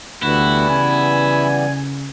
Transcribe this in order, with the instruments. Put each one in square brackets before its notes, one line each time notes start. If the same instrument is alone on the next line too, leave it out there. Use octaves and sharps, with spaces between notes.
[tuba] D2 [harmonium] E3 G3 B3 [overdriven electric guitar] E4 [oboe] F#4
[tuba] C#3 [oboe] G#5